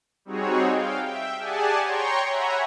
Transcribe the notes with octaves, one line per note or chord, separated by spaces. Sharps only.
G3 C4 D#4 F#4 G#4 C#5
F5 G5
E5 G5
G4 G#4 D5 F#5 G#5 A5
C#5 G5 A#5 C6 C#6
C#5 E5 F#5 G#5 A#5 B5